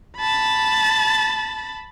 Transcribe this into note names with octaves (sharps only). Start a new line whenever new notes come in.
A5 B5